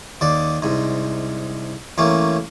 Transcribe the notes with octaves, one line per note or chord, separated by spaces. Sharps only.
D#2 D5
C2 G#2
A1 A3 A#3 C#4